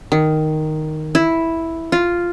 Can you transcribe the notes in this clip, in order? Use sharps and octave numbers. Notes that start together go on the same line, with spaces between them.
D#3
E4
F4